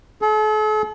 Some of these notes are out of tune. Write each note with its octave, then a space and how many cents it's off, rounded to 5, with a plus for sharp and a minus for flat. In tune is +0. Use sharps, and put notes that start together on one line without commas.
A4 -45